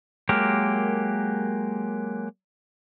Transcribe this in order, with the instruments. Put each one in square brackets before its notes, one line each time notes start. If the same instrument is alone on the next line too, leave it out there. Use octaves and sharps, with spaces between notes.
[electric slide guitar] F#3 G#3 A#3 G4 A#4